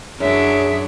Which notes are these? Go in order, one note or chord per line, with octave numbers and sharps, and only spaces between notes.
F#2 F#3 D4 G#4 E5